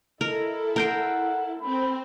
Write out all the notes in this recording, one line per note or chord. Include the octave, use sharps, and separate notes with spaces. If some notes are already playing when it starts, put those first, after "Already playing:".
E4 A4 A#4 D#5
A#4 C5 F#5 G5
C4 B5